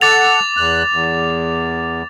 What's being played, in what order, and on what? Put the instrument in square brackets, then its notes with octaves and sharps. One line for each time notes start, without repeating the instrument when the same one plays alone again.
[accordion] A4 F#5 [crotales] D6 A6 F7
[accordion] E2 F#6
E2